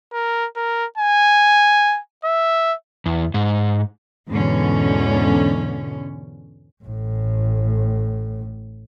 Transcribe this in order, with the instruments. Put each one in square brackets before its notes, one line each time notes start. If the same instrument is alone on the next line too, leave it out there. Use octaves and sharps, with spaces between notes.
[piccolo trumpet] A#4
A#4
G#5
E5
[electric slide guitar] E2
G#2
[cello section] E2 G#2 B2 D3 C#4
[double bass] A1 A2